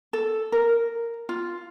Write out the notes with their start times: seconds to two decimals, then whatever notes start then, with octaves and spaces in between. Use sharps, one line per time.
0.13 A4
0.52 A#4
1.29 F4